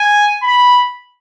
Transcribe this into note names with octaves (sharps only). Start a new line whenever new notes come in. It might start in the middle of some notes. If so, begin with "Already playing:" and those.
Already playing: G#5
B5